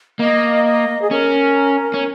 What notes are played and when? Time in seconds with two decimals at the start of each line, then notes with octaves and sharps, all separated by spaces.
0.19 A#3 D#5
0.65 D#5
1.02 G#4
1.11 C#4 A#4
1.94 C#4